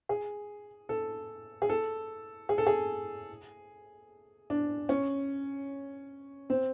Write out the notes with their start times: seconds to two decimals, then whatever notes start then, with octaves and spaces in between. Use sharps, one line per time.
0.09 G#4
0.89 A4
1.62 G#4
1.69 A4
2.49 G#4
2.58 A4
2.67 G#4
4.50 D4
4.89 C#4
6.50 C4